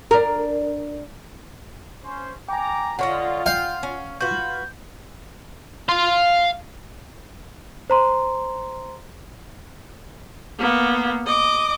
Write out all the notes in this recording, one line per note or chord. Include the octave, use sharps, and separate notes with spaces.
D4 A#4
C#4 C5
G5 G#5 A#5 D6
D3 F4 C#5 D#5 F#5
F5 G5
C#4
F4 F#4 B4 G6
F5 C6
C5 A#5 C6
A#3 B3
D#5 D6